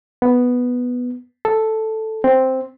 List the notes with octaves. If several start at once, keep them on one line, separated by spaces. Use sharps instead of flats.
B3
A4
C4